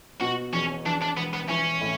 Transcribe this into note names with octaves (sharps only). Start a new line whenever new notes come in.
B2 F#4
E2 C#4
E2 D4
D4
E1 B3
B3
E3 C#4
A2